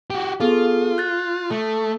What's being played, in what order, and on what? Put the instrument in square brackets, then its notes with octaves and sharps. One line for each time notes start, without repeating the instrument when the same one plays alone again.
[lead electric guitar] F#4 G4
[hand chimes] B3 G#4 A4 [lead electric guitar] F4
[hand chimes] F#6 A6
[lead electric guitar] A3 [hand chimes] A4